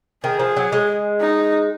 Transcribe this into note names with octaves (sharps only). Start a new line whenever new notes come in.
D#3 G#4
F3
F#3
G#3
D#4